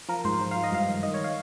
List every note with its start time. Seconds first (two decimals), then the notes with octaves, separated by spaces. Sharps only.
0.09 F3 A#4
0.25 G#2 C5
0.41 F3
0.51 F5
0.56 F3
0.64 D#5
0.72 G2 F5
0.88 D#3
1.03 D#3 D#5
1.14 C#5
1.24 F5